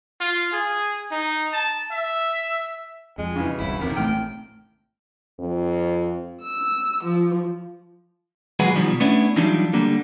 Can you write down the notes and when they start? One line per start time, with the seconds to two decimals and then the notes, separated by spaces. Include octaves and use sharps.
0.21 F4
0.53 G#4
1.12 D#4
1.53 A5
1.91 E5
3.18 F2 G#3
3.36 C#3 E3
3.60 G1 C2 F#3 E4
3.82 E2 C3 D#3 A#4
3.97 A1 A3 G5 F6
5.39 F2
6.41 E6
7.03 F3
8.60 D#2 F#3 G#3 F#4 G#4 B4
8.75 B2 D#3 F3 G3
9.00 A3 B3 C#4 D4 E4
9.36 E3 F#3 G3 D4 D#4 F4
9.73 D3 G3 A#3